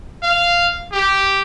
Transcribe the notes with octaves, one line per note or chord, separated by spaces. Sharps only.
F5
G4